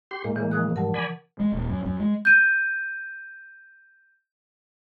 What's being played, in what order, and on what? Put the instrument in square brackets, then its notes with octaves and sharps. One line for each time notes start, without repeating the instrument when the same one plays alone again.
[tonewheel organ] G4 C6
A2 G#3 A#3
[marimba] C#3 E3
F3 D#6 F#6
[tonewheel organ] G#2 G3 [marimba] A#4 F#5 A5
[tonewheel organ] D5 G#5 B5
[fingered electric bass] G#3
D#1
F#2
F#2
G#3
[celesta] G6 D#7